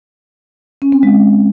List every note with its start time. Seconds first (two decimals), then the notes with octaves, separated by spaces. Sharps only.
0.82 C#4
0.92 C4
1.03 G#3